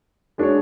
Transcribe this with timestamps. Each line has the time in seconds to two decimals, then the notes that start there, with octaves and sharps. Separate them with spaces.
0.38 G#3 D4 F#4 C#5